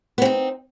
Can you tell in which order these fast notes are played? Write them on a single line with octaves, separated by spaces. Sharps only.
B3 C4 D#4